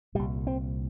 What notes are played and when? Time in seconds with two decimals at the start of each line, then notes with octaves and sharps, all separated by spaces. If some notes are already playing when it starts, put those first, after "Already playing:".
0.15 C2 A#2 G3
0.47 C4